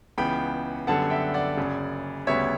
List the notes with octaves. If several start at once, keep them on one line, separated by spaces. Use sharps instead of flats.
C#2 C#3 E3 B3 G5 B5
F#2 D3 G3 B3 F#5 A5
E5 G5
D5 F#5
F#1 F#2 C#3
D2 C#3 G3 B3 C#5 E5